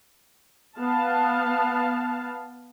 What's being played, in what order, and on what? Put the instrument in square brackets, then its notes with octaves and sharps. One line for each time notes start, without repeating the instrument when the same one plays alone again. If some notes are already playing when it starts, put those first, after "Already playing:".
[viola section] B3 F5 A5